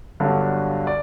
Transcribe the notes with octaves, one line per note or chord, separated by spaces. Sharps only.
G1 G2 D3 F#3
D5